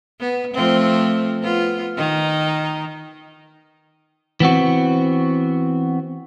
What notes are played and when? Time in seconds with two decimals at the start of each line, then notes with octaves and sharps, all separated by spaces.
0.20 B3
0.54 F3 A3 C4
1.42 B3 F4
1.97 D#3 D#4
4.40 E3 B3 C4 F#4